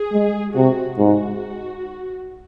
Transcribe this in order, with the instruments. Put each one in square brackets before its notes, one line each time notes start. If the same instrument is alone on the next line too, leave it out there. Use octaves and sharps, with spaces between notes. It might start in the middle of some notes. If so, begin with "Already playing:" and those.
Already playing: [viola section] G#4
[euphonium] G#3
[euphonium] C3 [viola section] F#4
[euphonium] G#2 [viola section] F#4